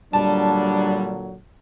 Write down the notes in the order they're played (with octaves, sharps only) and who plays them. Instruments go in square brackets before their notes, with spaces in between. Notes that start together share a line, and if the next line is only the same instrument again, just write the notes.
[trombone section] A#2 D3 F#3 [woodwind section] G3 [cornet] D4 [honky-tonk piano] A5